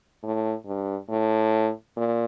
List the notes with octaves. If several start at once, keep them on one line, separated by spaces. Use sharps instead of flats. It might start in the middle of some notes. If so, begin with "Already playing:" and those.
A2
G2
A2
A#2